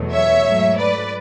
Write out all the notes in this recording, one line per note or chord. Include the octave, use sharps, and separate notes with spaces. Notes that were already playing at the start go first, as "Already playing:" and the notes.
Already playing: E2 B2 F#3 A3
C#5 E5
G#2 F#3 A3
B4 D5